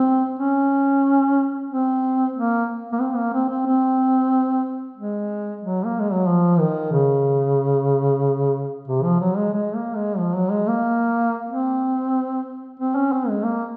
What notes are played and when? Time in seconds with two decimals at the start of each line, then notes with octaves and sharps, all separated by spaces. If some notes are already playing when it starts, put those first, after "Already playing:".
Already playing: C4
0.39 C#4
1.71 C4
2.35 A#3
2.93 A#3
3.01 C4
3.16 A#3
3.34 C4
3.49 C4
3.67 C4
4.97 G#3
5.61 F#3
5.86 A#3
6.00 G#3
6.13 F#3
6.27 F3
6.59 D#3
6.92 C#3
8.88 C3
9.04 F3
9.20 F#3
9.37 G#3
9.53 G#3
9.75 A#3
9.96 G#3
10.18 F3
10.34 F#3
10.51 G#3
10.68 A#3
11.49 C4
12.80 C4
12.96 C#4
13.13 C4
13.29 G#3
13.44 A#3